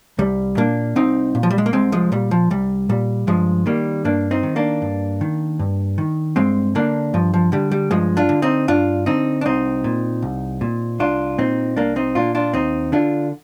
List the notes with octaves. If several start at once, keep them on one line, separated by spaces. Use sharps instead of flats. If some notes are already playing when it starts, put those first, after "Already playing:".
C2 G3
A#2 A#3 D4
C2 C4 D#4
A#2
F3
G3
G#3
A#3
C2 G#3 C4
F3 G#3
A#2 G3
F3
C2 G3
A#2 G3
G2 F3 G#3
D#3 G3 A#3
G2 A#3 D4
C4 D#4
D#3
A#3 D4
G2
D#3
G2
D#3
G2 G#3 C4
D3 A#3 D4
G2 F3
F3
D3 G3
G3
G2 F3 G#3
D4 F4
D3
C4 D#4
G2 D4 F4
D3 C4 D#4
D4
C2 C4 D#4
A#2
C2
A#2
C2 D4 F4
A#2 C4 D#4
C2 A#3 D4
C4 D#4
A#2 D4 F4
D4 F4
D#2 C4 D#4
D3 D4 F4